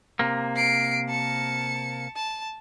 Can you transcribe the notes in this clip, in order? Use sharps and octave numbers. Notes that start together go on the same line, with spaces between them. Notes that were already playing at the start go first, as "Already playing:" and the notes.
C3 A#3
C7 D7
A5 C#7
A5